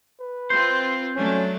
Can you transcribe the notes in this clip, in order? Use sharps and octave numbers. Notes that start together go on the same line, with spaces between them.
B4
C4 F4 C5
F#3 A3 C#4 D4